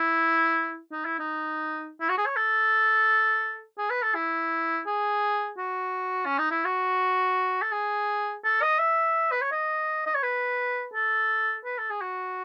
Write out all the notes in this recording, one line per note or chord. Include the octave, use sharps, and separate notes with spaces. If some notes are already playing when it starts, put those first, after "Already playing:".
Already playing: E4
D#4
E4
D#4
E4
F#4
G#4
C#5
A4
G#4
B4
A4
E4
G#4
F#4
C#4
D#4
E4
F#4
A4
G#4
A4
D#5
E5
B4
C#5
D#5
D#5
C#5
B4
A4
B4
A4
G#4
F#4